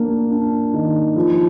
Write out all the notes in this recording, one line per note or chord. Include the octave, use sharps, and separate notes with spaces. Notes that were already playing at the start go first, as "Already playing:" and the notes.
Already playing: A#3 D4
D4
D#3
F3